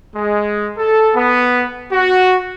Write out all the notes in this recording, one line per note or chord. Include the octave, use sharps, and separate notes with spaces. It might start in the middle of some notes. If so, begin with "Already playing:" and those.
G#3
A4
B3
F#4